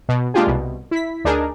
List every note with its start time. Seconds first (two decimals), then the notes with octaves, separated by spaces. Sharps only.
0.09 B2
0.34 G#3 A#3 D4 F4 G4 G#4
0.47 C2 B2
0.91 E4 B6
1.25 D2 D4 D#4 G#4 A#4